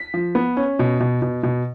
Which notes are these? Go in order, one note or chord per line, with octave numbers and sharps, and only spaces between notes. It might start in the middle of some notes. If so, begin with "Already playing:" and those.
Already playing: B6
F3
B3
C#4
B2
B2
B2
B2